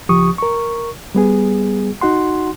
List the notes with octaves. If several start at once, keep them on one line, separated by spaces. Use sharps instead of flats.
C#2 F3 G4 C#6 D#6
A#4 C#6
G3 B3 G#4
D#4 F#4 F#5 C6